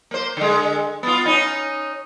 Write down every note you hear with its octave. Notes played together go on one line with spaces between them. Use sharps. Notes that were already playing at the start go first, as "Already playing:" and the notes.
A#3 C5
D3 G#3
B3 F4
C#4 D#4